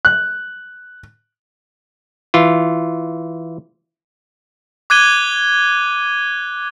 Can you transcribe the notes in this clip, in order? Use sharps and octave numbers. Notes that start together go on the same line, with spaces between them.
F#6
E3 F4
D6 F#6 G#6 D#7 G7